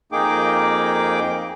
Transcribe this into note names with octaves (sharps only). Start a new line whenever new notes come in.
F2 A#3 D#4 G#4 G5 D6